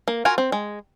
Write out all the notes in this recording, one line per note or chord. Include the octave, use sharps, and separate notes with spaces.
A#3
F4 F#4 A#4 G#5
C4
G#3